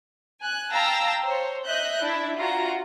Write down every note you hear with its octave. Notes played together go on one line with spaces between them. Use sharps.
G#5 F#6
F5 G5 A5 A#5 E6
C5 C#5
D#5 E5 F#6 G6
D4 E4 E5
F4 F#4 A#5